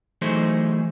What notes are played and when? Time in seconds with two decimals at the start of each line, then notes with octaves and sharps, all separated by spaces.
0.22 E3 F#3 A3 D#4 G#4 C5